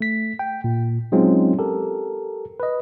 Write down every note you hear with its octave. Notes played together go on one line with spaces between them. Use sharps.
A3 B6
G5
A#2
F#3 G#3 C4 C#4 D#4 F4
G4 A4 A#4
B4 D#5